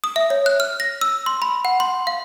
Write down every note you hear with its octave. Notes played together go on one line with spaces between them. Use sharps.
D#6
E5
C#5
F#6
F6
A#6
E6
C6
B5
F#5
C6
F5